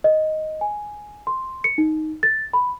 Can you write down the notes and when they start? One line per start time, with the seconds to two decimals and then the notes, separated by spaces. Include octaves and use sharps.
0.04 D#5
0.61 G#5
1.27 C6
1.64 C#7
1.78 D#4
2.23 A6
2.53 B5